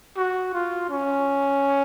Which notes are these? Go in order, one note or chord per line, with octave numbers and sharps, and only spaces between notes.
F#4
F4
C#4